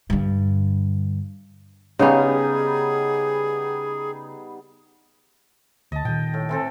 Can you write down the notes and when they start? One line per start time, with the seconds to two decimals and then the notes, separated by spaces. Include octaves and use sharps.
0.10 G2 D3
1.99 C#3 G3 B3 C#4 D#4 G#4
5.92 D2 D#5 A5
6.05 A#2 D#3 G5
6.34 A2
6.49 E3 C4 A4